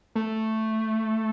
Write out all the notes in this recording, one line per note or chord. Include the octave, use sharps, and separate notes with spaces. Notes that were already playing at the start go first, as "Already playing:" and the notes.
A3